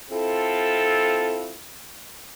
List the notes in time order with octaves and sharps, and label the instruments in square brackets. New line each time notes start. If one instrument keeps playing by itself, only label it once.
[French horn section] C4 E4 F4 A4